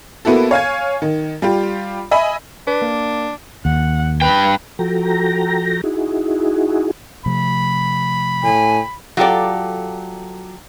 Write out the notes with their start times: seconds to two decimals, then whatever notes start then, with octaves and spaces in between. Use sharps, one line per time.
0.25 A#3 B3 E4 F#4 A4
0.51 C#5 F5 G#5 G#6
1.02 D#3
1.42 G3 F4 G4
2.11 D#5 E5 G#5 B5
2.67 D4 B4
2.82 A#3
3.65 D#2 F#5
4.21 G2 B4 G5
4.79 F3 F#4 A4 G5 A#5 A#6
5.84 D#4 E4 F#4 G#4
7.26 C3 F3 A3 B5
8.43 A2 G#5
9.17 F#3 F4 G4 A4 D5